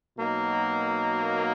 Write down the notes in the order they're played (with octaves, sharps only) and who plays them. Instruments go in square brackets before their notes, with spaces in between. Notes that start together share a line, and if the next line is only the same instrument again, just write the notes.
[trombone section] B2 F#3 A#3 D#4